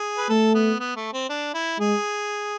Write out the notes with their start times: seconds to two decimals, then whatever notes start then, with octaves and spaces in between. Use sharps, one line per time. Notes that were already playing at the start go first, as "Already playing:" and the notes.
Already playing: G#4
0.18 B4
0.29 A3 A4
0.54 B3
0.80 B3
0.96 A3
1.13 C4
1.29 D4
1.54 E4
1.79 G#3 G#4